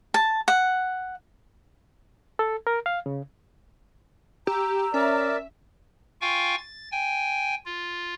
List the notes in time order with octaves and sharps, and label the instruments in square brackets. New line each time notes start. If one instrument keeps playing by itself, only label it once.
[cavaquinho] A5
F#5
[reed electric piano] A4
A#4
F5
C#3
[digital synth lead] G4 [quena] A#5 [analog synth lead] E6
[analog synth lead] C#4 [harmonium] A#4 D5 [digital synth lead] E5
[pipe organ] F4 F5 G5 G#5 C#6
A6
G5 G#5
F4